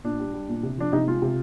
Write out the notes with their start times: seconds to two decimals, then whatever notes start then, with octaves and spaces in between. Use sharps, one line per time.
0.04 A#2 D4
0.19 G3
0.34 G3
0.49 A#2
0.63 C3
0.78 F3 D4
0.93 C3 D#4
1.07 G#3 F4
1.22 C3